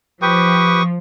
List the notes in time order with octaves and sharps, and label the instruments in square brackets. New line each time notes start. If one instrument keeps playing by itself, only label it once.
[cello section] F3 [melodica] G4 B4 G5 [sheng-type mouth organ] C#6 D#6